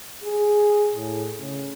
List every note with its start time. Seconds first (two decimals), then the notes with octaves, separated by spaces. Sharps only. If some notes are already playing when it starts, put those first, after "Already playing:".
0.23 G#4
0.95 A2
1.39 C#3